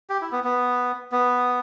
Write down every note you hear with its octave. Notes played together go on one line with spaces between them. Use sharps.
G4
E4
B3
B3
B3